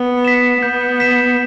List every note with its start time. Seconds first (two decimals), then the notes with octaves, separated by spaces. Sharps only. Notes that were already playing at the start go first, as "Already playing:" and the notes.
Already playing: B3
0.25 B6 E7
0.62 B3 G6
1.00 B6 E7